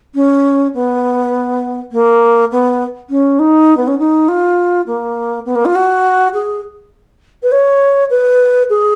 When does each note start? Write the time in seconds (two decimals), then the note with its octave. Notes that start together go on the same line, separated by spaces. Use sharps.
0.15 C#4
0.74 B3
1.92 A#3
2.51 B3
3.10 C#4
3.39 D#4
3.77 B3
3.87 C#4
3.99 D#4
4.28 F4
4.87 A#3
5.46 B3
5.55 A#3
5.65 F4
5.75 F#4
6.33 G#4
7.43 B4
7.52 C#5
8.10 B4
8.70 G#4